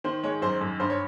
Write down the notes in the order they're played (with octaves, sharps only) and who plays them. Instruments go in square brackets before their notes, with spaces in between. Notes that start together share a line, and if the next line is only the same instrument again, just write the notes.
[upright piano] D#3 [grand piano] C5
[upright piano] G#3 [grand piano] C#5
[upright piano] F#2 [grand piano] C5
[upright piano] F#2
[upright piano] G2 [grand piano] C5
[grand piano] C#5